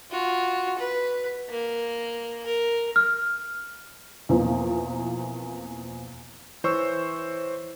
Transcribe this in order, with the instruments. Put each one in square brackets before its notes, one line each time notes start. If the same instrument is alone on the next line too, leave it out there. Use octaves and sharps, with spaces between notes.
[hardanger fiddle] F4 F#4
B4
A#3
A#4
[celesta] F6
[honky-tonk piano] E2 B2 E3 F3 A#3 C4
[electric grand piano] E3 C5 C#5 C#6 E6